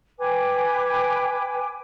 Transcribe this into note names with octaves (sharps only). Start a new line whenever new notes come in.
B4 G5 G#5 D6